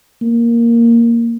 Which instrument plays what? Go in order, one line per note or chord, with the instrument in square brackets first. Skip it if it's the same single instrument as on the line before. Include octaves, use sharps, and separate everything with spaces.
[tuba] A#3